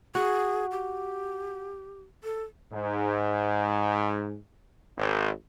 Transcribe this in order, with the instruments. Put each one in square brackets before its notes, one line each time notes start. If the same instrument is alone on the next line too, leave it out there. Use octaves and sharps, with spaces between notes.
[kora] F#4 [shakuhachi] G#4
[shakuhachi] G4
A4
[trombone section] G#2
G#1